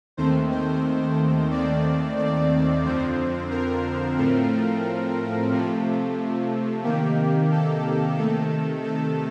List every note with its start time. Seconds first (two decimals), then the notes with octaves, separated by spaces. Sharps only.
0.17 D#2 D#3 A3 C4 C5
0.51 C5
1.51 D#2 D#3 A3 C4 D5
2.18 D5
2.84 F2 D3 F3 C4 C5
3.51 A#4
4.17 A2 F3 A3 C4
5.51 C3 F3 A3
6.84 C3 D#3 A#3 G4
7.51 A4
8.17 C3 D#3 A3 A4
8.84 A4